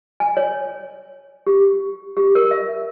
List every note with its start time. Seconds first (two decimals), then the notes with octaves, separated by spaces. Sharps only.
0.20 G#5
0.37 C#5
1.47 G4
2.17 G4
2.35 A#4
2.51 E5